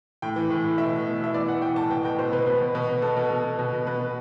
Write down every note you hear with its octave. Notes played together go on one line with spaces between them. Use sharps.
A2 G5
E3
A2
A2
B2 E5
B2
B2
B2 E5
E3 D5
E3 F#5
E3 G5
A2 A5
B2 G5
B2 G5
B2 C5
B2 B4
B2 B4
B2
B2
B2
B2 A4
B2
B2
B2
B2
B2
B2 B4
B2